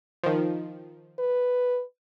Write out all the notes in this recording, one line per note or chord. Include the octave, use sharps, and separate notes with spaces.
D#3 F3
B4